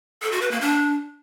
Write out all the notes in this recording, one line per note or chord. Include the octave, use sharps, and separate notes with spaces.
A4
F#4
B4
A#3
D4